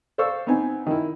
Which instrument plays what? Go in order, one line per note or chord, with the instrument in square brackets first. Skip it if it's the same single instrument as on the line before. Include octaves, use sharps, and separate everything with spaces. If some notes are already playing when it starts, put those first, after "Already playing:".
[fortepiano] A4 C5 D5 F5 C#6 E6
B3 C4 D#4 G#5
D#3 E4